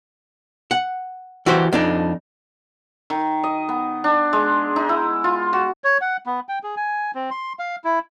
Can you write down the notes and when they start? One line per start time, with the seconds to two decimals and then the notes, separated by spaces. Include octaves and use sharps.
0.71 F#5
1.46 E3 F#4 G4 C5
1.73 F2 D4 D#4
3.10 D#3
3.44 D#5
3.69 B3
4.04 D4
4.33 G#3
4.76 D#4
4.89 E4
5.24 F4
5.53 F#4
5.84 C#5
6.01 F#5
6.26 B3
6.49 G5
6.64 G#4
6.77 G#5
7.15 C4
7.31 C6
7.59 F5
7.84 E4